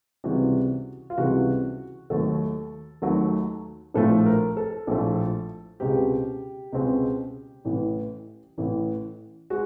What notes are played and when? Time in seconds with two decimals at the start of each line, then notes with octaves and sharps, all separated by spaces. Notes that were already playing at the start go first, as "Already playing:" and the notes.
0.24 C#2 C3 E3 G3 F#4
1.10 F4
1.17 C#2 C3 E3 G3 F#4
2.10 D#2 D#3 F#3 A3 A4
3.02 D#2 D#3 F#3 A3
3.94 A#1 A2 F3 A3 A4
4.26 A#4
4.57 A4
4.87 A#1 A2 F3 A3
5.80 C#2 B2 G#3 C4 G4
6.73 C#2 B2 G#3 C4
7.65 A1 A2 E3
8.58 A1 A2 E3
9.50 G#3 F#4